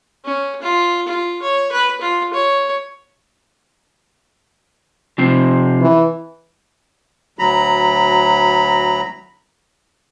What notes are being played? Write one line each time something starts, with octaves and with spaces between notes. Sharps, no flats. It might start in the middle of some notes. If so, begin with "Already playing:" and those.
C#4
F4
F4
C#5
B4
F4
C#5
C3 F3
E3
D2 F#3 A#5 B5